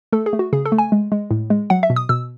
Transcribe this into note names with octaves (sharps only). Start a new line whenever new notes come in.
A3 A4
G#4
A3
F#4
C#3 G#4
A4
A3
G#5
G#3
G#3
A2
G#3
F#3 F#5
E5
B2
D#6
B2 E6